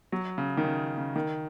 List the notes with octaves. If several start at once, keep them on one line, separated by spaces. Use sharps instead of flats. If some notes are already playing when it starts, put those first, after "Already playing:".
F#3
C#3
D#3
C#3
C#3
D#3